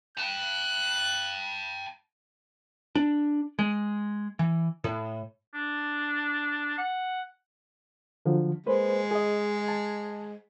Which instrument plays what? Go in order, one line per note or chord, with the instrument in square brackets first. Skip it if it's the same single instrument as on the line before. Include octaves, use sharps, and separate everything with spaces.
[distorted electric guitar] G5 A5 [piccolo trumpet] F#6
[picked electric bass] D4
G#3
E3
A2
[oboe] D4
F#5
[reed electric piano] D3 F3 F#3
[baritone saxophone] G#3 [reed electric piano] A#3 B4 C5
[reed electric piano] G#4 D#5
A5